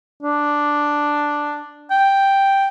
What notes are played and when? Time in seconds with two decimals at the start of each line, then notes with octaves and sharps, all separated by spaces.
0.23 D4
1.91 G5